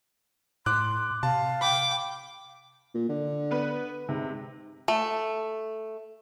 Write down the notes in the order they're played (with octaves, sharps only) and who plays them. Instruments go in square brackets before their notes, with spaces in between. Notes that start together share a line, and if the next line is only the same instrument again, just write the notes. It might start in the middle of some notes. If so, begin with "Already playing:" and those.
[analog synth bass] A2 [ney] C6 [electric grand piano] D6 F#6
[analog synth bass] C3 [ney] F5 [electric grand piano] A5
[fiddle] G5 D6 [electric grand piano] B5
[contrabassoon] A#2
D3
[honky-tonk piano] B3 B4
[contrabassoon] G#2 [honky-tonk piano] C3
[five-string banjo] A3